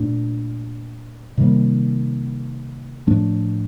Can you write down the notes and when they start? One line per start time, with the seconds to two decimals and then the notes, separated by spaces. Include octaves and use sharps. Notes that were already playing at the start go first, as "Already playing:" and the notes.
Already playing: A#2 A3 D4
1.38 C3 D#3 G3 A#3
3.07 A2 F3 A3 D4